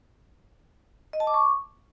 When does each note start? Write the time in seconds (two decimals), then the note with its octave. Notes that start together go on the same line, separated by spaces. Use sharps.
1.13 D#5
1.20 A5
1.27 D6
1.34 C#6